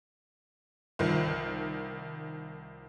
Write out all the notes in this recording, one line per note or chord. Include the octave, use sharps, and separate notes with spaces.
C2 D#3 F3